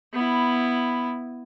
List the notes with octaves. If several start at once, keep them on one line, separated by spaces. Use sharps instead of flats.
B3 E4